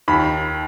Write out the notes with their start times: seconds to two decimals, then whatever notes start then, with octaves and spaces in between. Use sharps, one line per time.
0.08 D#2 B5